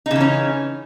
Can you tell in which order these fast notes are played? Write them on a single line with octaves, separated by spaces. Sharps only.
D#4 C#3 E3 C#4